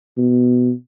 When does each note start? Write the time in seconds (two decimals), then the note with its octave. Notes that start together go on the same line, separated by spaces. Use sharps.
0.17 B2